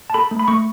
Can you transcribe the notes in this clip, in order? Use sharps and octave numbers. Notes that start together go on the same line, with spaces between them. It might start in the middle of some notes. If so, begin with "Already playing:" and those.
A5
A4 B5
A3
B5
A3 C#6